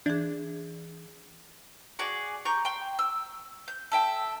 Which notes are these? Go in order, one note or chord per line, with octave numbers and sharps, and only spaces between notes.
E3 D4 G#4
F#4 G#4 D5
G4 A#5 C#6 G6
G5 C6
E6
G6
A4 E5 G5